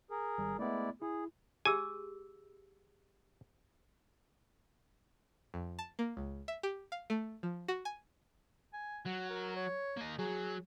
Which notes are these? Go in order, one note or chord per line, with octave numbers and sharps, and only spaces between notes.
G#4 A#4
G#1 G3
G#3 A3 B3 E4 D5
E4 G#4
G4 G#4 G#5 E6
F2
A5
A#3
C#2
E5
G4
F5
A3
F3
F#4
G#5
G#5
F#3 F#5
A#4
C#5
A#3 D#5
F#3 G#4